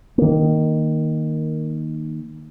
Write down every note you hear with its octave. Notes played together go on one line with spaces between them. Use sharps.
D#3 A#3